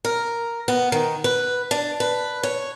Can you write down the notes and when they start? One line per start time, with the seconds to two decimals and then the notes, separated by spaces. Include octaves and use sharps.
0.05 A#4
0.68 B3
0.92 D#3
1.24 B4
1.71 D4
2.00 B4
2.43 C#5